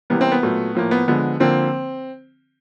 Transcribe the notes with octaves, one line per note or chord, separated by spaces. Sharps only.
C3 E3 G3 A#3 B3
C4
B3
A#2 F#3 A3
A2 F3 A#3
B3
D3 F3 G#3 B3
D3 F3 A#3 C4